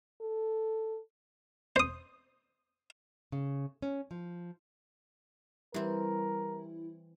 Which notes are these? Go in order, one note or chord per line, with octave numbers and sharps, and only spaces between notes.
A4
C5 D#6
C#3
C#4
F3
E3 G3 C4 E4 A#4